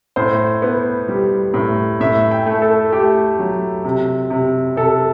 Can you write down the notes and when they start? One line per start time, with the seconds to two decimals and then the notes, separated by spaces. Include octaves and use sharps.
0.16 A2 C5
0.62 B3
1.08 G3
1.54 A2
2.00 A2 E5
2.31 G5
2.46 A3
2.62 A4
2.92 A3 G4
3.39 F#3
3.85 C3
4.30 C3
4.76 C3 A4